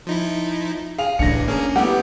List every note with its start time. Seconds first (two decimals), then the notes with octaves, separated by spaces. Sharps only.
0.07 F3 D#4 E4
0.98 G#4 F5 F7
1.19 C2 A2 D3 E3 D4 A#6 C#7
1.48 A#3 C#4 G#4 A#4
1.76 G3 A3 B3 E4 G4 F#5